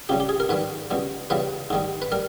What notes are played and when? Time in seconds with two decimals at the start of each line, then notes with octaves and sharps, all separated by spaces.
0.09 C#2 C#3 G3 G4
0.20 G4
0.29 G#4
0.40 A#4
0.49 G#2 D#3 G3 B4
0.91 C#2 B2 G3
1.30 C#2 C#3 E3 G3 B4
1.70 G#2 D#3 G3
2.02 B4
2.12 G3 A#4